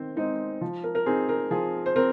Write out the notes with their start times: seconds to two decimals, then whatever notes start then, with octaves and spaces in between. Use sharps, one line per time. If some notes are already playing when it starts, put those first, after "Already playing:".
Already playing: D#3 C4 C5
0.16 G#3 C4 D#4 D#5
0.61 F3
0.84 A#4
0.95 A#4
1.06 C4 D#4 G#4
1.29 A#4
1.51 F3 G#4
1.86 C5
1.96 C4 A#4